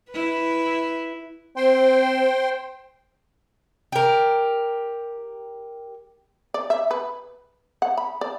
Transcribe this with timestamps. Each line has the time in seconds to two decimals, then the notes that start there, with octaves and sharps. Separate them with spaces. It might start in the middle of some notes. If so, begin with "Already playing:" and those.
0.11 E4 B4
1.57 C4 C5 G5 C6
3.92 G4 A#4
6.54 D5
6.70 E5
6.91 B4
7.82 F#5
7.98 B5
8.21 D5